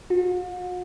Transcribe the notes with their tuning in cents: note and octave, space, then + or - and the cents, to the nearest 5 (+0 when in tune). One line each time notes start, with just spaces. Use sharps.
F#4 -45